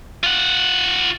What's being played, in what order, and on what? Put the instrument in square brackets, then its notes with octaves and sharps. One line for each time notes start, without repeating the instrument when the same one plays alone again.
[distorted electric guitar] F4 F#5